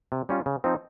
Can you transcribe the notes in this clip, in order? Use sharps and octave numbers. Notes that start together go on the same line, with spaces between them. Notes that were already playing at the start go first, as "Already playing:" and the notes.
C3
G3 C#4 F4
C#3
F3 C4 D#4